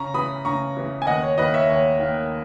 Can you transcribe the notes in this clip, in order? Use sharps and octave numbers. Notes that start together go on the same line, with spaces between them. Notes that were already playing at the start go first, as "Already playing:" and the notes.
Already playing: C#3 A#5 C#6
E3 B3 B5 D#6
C#3 A#5 C#6
E3 B3
G#5
D#2 D#5 F#5
C#5
D#3 A#3 B4 D#5
C#5 E5
D#2 C#5
D#3 A#3